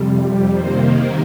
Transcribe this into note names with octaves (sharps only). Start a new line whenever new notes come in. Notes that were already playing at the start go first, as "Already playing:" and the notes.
Already playing: F2 C3 G3
C3 D#3 A#3 C5